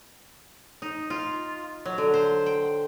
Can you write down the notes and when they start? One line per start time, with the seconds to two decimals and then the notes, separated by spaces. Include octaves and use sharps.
0.82 D#4
1.10 F4
1.85 F#3
1.98 D3
2.14 C5
2.46 G5